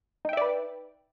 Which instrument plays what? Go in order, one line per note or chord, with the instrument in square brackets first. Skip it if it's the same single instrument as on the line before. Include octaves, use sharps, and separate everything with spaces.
[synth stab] D#4
G5
E5
D5
B4